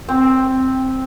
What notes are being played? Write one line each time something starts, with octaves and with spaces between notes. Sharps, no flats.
C4